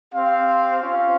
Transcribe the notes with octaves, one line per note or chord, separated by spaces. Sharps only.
C4 G4 C5 F5
C#4 F4 C5 F5